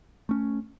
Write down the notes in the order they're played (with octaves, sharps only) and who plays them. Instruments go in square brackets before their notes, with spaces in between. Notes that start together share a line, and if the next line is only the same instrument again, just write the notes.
[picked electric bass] A3 C#4